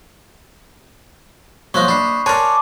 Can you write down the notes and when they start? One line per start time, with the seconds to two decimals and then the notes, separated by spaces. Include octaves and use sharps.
1.74 F3 F#3 A#3 C5 D#5 C#6 F#6
1.88 D4 B5 C7
2.26 A#4 C#5 D5 G#5 A5 C6 F#6